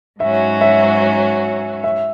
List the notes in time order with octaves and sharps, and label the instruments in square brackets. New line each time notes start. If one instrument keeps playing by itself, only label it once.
[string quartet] G#2 F#3 C#4 F#4 [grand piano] E5
[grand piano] E5
E5